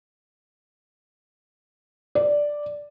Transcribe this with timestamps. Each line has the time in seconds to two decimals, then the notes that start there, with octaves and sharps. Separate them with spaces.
2.15 D5